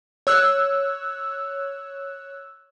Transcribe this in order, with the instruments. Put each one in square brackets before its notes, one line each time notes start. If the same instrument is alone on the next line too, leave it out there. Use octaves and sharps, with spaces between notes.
[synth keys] C#5 E6 F#6